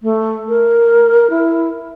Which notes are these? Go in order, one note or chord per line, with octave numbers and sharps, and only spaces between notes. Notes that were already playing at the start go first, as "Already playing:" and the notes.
A3
A#4
E4